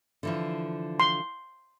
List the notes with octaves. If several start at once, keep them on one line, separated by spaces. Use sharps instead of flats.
D3 E3 F3
C6